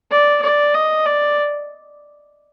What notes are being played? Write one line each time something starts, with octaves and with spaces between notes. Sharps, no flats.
D5
D5
D#5
D5